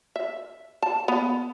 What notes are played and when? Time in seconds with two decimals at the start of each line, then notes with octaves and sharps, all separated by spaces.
0.16 E5
0.82 A5
1.08 B3